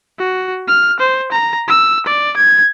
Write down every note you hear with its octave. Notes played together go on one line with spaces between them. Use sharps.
F#4
F6
C5
A#5
E6
D5
G#6